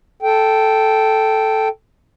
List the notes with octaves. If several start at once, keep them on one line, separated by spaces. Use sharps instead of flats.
A4 G5